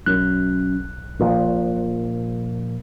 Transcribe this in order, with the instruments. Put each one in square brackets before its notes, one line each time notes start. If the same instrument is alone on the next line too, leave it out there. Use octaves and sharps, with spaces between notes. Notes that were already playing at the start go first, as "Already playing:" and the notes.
[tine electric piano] B1 F#6 [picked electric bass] F#2
[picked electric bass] A#1 A#2 F3